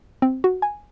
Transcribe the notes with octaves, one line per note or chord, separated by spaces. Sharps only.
C4
F#4
G#5